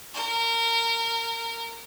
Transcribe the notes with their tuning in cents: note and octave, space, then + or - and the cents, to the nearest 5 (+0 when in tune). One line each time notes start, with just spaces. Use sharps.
A#4 -20